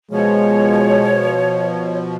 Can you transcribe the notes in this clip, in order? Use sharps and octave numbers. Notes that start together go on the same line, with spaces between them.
B2 F3 G#3 C#5